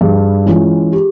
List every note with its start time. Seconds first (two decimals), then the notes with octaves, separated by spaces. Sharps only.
0.01 G2 G#4
0.46 E3 G#3 C#4 F4
0.93 G4